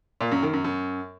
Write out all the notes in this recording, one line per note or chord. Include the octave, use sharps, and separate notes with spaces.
A#2
F#2
D#3
F#2
F#2